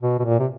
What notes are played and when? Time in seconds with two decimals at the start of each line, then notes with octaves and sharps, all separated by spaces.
0.02 B2
0.20 B2
0.24 A#2
0.39 C3